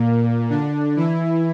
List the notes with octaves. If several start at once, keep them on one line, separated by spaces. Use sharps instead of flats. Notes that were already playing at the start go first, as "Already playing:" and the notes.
Already playing: A#2 A#3
D3 D4
E3 E4